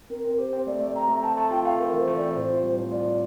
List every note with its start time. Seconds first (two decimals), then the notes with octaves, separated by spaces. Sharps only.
0.10 C4 A#4
0.24 C4
0.38 G4 C5
0.53 C4
0.67 A3 D5
0.80 A3
0.95 C4 A#5
1.08 A3
1.22 C4 A5
1.36 A3 A5
1.51 F4 G5
1.65 A3 F5
1.79 C4 A#4
1.93 E3
1.98 C5
2.07 A3
2.16 D5
2.21 C4
2.35 A2 C5
2.50 F4
2.63 G3
2.78 A2
2.91 F4 D5
3.05 A2